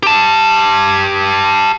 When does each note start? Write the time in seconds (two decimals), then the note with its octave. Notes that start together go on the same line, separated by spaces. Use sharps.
0.03 G4 A5